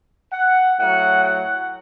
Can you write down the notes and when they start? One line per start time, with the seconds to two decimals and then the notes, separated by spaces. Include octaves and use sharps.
0.33 F#5
0.79 A2 F#3 F#5
1.25 F#5